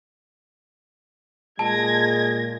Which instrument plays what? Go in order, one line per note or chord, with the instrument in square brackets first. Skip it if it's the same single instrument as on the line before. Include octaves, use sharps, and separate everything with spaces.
[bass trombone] A#2 [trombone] G#3 [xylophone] A5 [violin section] G#6 A#6